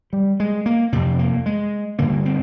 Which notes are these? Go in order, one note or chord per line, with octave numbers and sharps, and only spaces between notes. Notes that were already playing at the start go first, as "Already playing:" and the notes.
G3
G#3
A#3
F2 C3 C4
A#3
G#3
G2 D3 A#3
C4